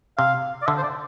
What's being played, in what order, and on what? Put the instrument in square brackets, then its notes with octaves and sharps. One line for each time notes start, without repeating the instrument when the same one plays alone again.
[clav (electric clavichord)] C3 [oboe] F5
[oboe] D5
[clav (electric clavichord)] D3 [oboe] E5
[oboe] C5
D5